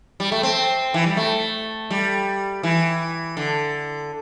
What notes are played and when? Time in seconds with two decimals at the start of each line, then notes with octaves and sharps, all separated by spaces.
0.20 G3
0.32 A3
0.43 C4
0.94 E3
1.06 G3
1.17 A3
1.90 G3
2.63 E3
3.37 D3